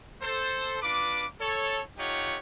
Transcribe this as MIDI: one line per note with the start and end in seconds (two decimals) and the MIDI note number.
0.22 0.79 69
0.22 0.79 72
0.82 1.25 62
0.82 1.25 65
0.82 1.25 71
0.82 1.25 86
1.39 1.80 69
1.39 1.80 73
1.98 2.38 57
1.98 2.38 63
1.98 2.38 65
1.98 2.38 67
1.98 2.38 73
1.98 2.38 78